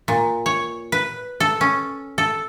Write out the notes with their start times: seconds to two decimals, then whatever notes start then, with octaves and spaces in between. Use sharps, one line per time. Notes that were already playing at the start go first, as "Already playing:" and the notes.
0.08 A#2
0.46 C#5
0.92 B4
1.40 A4
1.61 C#4
2.18 A4